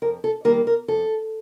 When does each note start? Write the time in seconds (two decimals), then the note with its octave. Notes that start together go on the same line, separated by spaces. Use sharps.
0.02 F2 A#4
0.24 A4
0.45 D#3 G3 A#3 A#4
0.67 A#4
0.88 F2 A4